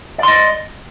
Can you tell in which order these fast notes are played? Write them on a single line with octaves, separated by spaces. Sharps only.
D5 C6 D#5